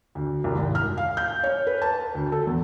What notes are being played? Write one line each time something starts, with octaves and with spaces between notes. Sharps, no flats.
D2
C2
G#1
F6
F5
G6
C#5
B4
A5
D2
A4
E2